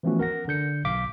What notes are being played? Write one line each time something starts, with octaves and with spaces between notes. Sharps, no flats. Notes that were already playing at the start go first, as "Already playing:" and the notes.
E3 F3 A3 B3 C#4 F#4
A#4 F#5 A#6
D3 G6 C#7
B1 F5 D6 B6